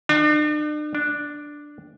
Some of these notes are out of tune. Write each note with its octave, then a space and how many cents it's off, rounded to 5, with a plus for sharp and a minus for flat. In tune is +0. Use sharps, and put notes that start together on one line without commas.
D4 +40
D4 +0